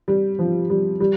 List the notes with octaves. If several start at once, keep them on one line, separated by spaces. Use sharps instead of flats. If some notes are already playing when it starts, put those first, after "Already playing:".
G3
F3
G3
G3